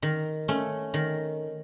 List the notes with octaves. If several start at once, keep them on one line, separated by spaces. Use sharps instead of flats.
D#3
A3 C#4
D#3